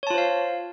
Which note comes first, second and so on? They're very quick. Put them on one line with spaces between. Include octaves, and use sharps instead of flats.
C#5 A5 F4 C5 F5